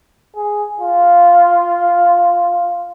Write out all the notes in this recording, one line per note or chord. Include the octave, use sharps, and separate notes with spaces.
G#4
F4